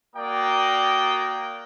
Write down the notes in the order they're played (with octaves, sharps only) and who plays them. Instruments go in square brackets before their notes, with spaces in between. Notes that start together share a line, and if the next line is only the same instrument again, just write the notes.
[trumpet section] A#3 F#4 A#4 D5 G5 D#6